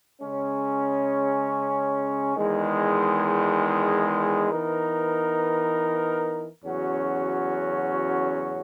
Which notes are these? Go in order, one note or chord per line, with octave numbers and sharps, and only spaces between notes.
C#3 G#3 C#4
E2 D#3 G#3
E3 B3 D#4 A#4
E2 C#3 F#3 C#4 F#4